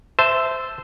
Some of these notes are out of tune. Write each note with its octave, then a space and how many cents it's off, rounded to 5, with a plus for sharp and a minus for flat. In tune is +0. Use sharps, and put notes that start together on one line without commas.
C5 -15 E5 +0 A5 +0